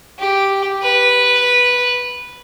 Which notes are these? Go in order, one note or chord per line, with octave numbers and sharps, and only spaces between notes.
G4
B4